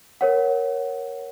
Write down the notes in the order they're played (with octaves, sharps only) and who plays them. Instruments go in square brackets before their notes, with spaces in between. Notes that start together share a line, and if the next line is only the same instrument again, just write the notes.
[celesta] A#4 C#5 F#5